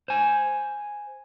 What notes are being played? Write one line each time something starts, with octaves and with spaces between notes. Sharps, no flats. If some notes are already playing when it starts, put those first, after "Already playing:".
C5 G#5